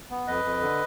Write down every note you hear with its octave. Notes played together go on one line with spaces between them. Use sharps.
B3
F2 B4 D#5
F2
D3